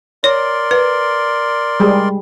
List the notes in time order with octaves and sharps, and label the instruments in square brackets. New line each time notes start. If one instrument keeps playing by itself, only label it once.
[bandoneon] A#4 D5 C6 [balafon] C#5
[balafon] B4
[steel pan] G3 G#3 G#4